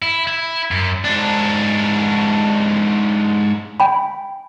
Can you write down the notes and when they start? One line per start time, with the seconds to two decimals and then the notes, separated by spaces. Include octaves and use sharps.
0.02 E4
0.27 E4
0.71 F#2
1.05 G#2 D4
3.80 G5 G#5 B5